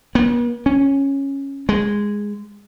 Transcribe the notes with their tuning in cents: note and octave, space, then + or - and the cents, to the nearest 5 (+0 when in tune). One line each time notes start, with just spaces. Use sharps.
B3 -45
C#4 -10
G#3 -10